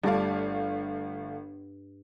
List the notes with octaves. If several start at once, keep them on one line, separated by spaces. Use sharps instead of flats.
G1 G2 A3 A4 D5 F5